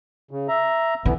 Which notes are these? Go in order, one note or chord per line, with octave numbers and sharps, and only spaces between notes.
C#3
E5 A#5
D3 E3 B3